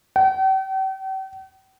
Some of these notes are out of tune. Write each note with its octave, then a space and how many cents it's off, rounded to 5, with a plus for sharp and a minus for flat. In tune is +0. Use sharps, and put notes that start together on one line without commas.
G5 -45